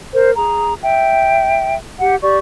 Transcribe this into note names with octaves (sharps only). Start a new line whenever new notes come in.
A#4 C5
G#4 A#5
E5 G5
G4 F#5
G4 D5 C#6